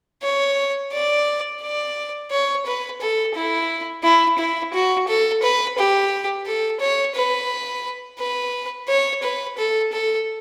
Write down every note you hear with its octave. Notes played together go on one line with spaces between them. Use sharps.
C#5
D5
D5
C#5
B4
A4
E4
E4
E4
F#4
A4
B4
G4
A4
C#5
B4
B4
C#5
B4
A4
A4